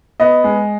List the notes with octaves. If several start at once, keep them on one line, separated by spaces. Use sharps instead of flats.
B3 D#5
G#3